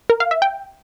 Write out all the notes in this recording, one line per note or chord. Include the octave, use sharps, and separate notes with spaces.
A#4
F5
E5
G5